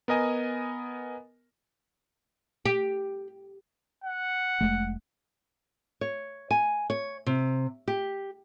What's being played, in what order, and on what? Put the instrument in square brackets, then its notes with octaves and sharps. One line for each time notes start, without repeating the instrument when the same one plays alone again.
[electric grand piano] B3 A#4 D#5 G#5
[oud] G4
[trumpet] F#5
[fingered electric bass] F1 G#3 A3
[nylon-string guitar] C#5
G#5
C#5
C3
G4